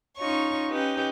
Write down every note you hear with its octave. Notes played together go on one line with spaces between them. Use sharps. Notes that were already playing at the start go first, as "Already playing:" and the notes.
C#4 D#4 F4 C#5 C#6
C#4 D#4 G4 B4